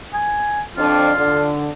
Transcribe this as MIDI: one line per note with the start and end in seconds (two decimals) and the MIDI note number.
0.14 0.62 80
0.77 1.11 41
0.77 1.11 62
0.77 1.49 65
1.17 1.68 50